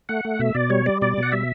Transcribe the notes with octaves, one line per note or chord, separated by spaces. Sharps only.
A3 F#5
A3
B2 E5
B2 D5
G3 C#5
G3 D5
B2 D5
B2
F#5
G3 E5